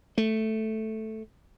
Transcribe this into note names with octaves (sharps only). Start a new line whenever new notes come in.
A3